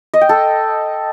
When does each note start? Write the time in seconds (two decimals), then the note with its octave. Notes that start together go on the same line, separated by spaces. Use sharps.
0.14 D#5
0.21 G5
0.29 A4